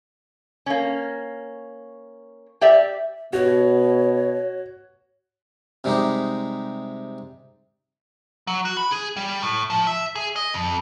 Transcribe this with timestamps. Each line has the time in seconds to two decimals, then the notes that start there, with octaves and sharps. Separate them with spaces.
0.66 A#3 C#4
2.61 G4 D5 E5
3.33 B2 F#4 C#5
5.84 C3 G3 G#3 D#4 G4
8.47 F#3
8.65 F#4
8.77 B5
8.91 G#4
9.17 G3
9.42 A2
9.70 F3
9.87 E5
10.15 G#4
10.36 D#5
10.54 F2